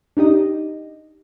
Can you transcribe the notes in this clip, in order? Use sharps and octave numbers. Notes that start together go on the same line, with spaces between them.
D4 D#4 G4 D#5